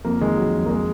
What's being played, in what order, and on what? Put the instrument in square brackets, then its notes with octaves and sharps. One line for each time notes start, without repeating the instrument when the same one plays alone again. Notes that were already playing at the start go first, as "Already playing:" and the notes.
[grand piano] F2 A#3
D#3 G#3
F#3
F2
A#3
G#3